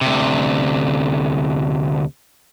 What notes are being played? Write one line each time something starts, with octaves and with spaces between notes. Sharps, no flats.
D2 C3